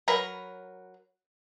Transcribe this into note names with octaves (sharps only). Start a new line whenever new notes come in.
F#3 A#4 B4